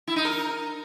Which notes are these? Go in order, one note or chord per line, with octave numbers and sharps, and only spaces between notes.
E4
D#4
A#4